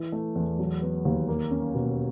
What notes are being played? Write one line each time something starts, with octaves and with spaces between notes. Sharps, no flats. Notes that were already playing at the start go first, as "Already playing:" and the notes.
Already playing: E3
A3
E2
F#3
B3
D#2
A#3
C#4
B2